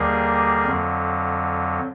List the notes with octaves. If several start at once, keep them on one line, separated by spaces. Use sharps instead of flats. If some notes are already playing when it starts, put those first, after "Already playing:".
Already playing: D#2 D3 G3 A#3 G#4 A#4
F2 D3 F#3